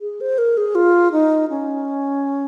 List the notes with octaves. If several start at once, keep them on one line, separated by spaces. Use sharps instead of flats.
G#4
C5
A#4
G#4
F4
D#4
C#4